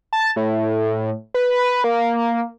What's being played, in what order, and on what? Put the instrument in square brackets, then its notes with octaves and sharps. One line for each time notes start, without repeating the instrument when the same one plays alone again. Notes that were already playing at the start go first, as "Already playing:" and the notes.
[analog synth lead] A5
A2
B4
A#3